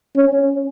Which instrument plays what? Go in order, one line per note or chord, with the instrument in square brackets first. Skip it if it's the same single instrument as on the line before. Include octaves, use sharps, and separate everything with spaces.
[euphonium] C#4